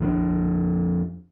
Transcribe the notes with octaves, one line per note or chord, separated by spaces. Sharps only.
F2 F3 A#3 D4